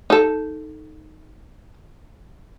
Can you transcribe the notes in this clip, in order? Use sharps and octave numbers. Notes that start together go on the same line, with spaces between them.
D#4 A4